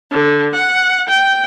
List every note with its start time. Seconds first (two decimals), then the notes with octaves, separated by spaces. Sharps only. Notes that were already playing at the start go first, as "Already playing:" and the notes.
0.10 D3
0.53 F#5
1.09 G5